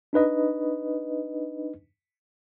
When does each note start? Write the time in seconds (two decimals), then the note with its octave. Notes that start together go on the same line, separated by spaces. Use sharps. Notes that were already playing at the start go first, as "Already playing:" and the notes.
0.13 D4 D#4 B4 D#5